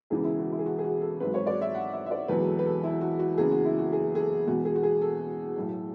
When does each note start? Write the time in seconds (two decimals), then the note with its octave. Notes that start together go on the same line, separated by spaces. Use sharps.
0.10 E1 E2 C#3 E3 G#4
0.24 E4
0.39 F#4
0.52 E4
0.59 G#4
0.66 F#4
0.79 G#4
0.84 F#4
1.01 A4
1.20 G#1 G#2 F#3 B4
1.34 C#5
1.47 D5
1.61 E5
1.75 F#5
1.93 E5
2.06 E5
2.11 D5
2.28 E1 E2 B2 F#3 B4
2.46 A4
2.59 B4
2.66 A4
2.84 E4
3.01 F#4
3.19 F#4
3.38 F#1 E2 C#3 G#4
3.51 F#4
3.65 E4
3.79 F#4
3.93 G#4
4.15 G#4
4.20 A4
4.46 E1 E2 B2 F#4
4.65 G#4
4.76 F#4
4.83 G#4
5.01 A4
5.56 B1 A2 F#3